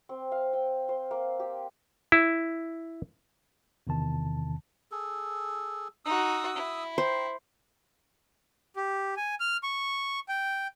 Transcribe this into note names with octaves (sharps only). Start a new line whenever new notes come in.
C4
F5
G5
C5
A#3
G4
E4
E2 C3 D#3 A5
G#4 A4
D#4 F#4 D#6 E6
E4
C5 G5 A#5
G4
G#5
F6
C#6
G5